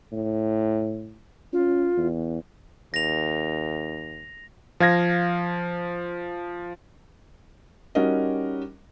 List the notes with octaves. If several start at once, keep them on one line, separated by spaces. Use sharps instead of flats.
A2
C#4 F4
E2
D#2 A#6 F7
F3 F5 G#6 A#6
G3 C#4 D#4 F#4 A#4 D#5